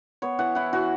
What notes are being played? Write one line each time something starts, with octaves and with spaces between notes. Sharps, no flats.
B3 C#5
E3 F#5
E4 F#5
E3 F#4